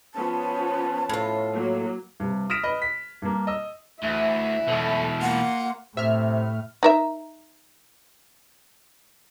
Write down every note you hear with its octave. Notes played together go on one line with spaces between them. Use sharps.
F3 B3 C#4 A5
A2 F4
F#3 A#3
G2 C3
D#6 F6 A#6 B6 D7 E7
B4 D#5 B5
B6
G2 A#3
D#5 E6
D2 E3 E5
B1 B2 E3 A3
A#3 F4 F#5
A2 C3 E5 F6
D#4 A#4 E5